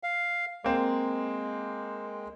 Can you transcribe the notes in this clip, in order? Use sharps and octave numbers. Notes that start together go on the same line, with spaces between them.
F5
G#3 A#3 C4